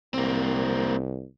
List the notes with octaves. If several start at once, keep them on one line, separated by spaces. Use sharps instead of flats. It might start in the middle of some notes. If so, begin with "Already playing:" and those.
C2 A#3 C4